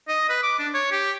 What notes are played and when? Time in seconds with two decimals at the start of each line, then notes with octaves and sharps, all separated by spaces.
0.08 D#5
0.29 B4
0.43 D6
0.59 D4
0.74 C#5
0.92 G4